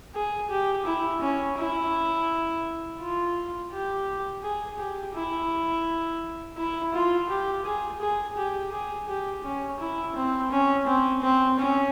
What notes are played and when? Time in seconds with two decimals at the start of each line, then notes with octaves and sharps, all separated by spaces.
0.15 G#4
0.50 G4
0.86 E4
1.21 C#4
1.58 E4
3.00 F4
3.72 G4
4.43 G#4
4.79 G4
5.15 E4
6.57 E4
6.94 F4
7.29 G4
7.65 G#4
8.01 G#4
8.37 G4
8.72 G#4
9.09 G4
9.44 C#4
9.80 E4
10.16 C4
10.51 C#4
10.87 C4
11.22 C4
11.59 C#4